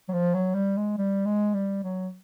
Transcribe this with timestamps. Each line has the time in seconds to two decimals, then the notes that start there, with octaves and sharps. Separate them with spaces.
0.09 F#3
0.13 F3
0.34 F#3
0.54 G3
0.77 G#3
0.98 G3
1.25 G#3
1.54 G3
1.83 F#3